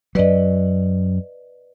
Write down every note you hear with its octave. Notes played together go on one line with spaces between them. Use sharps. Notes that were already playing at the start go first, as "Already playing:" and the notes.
F#2 F#3 B4 D5 D#5